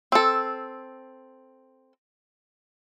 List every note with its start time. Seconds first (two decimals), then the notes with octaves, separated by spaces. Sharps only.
0.12 C4 A4